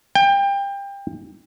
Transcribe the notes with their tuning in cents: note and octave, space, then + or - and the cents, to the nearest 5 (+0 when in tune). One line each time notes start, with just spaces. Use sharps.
G5 +25